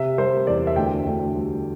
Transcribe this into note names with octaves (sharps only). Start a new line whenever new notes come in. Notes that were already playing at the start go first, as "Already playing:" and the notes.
Already playing: C3 E5
G3 C5
E2 D5
E5
D2 G5
D2
G3